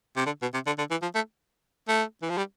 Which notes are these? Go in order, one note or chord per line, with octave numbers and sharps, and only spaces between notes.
C3
D3
B2
C3
D3
D3
E3
F3
A3
A3
E3
F3
G3